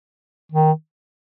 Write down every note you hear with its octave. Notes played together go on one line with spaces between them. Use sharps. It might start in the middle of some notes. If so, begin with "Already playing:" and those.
D#3